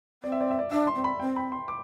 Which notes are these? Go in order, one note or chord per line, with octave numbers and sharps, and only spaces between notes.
C4 D5
E5
D5
E5
D5
D4 E5
C6
C4
B5
C4 G5
B5
C6
D6